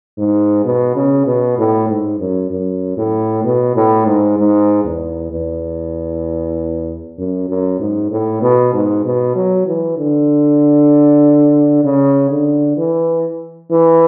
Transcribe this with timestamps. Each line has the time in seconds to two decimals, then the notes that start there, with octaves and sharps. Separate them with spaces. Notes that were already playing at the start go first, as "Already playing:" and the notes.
0.18 G#2
0.65 B2
0.95 C#3
1.26 B2
1.58 A2
1.89 G#2
2.20 F#2
2.51 F#2
2.97 A2
3.44 B2
3.76 A2
4.06 G#2
4.38 G#2
4.84 E2
5.31 E2
7.18 F#2
7.49 F#2
7.79 G#2
8.11 A2
8.42 B2
8.74 G#2
9.05 B2
9.35 F#3
9.66 E3
9.97 D3
11.84 C#3
12.30 D3
12.77 E3
13.71 E3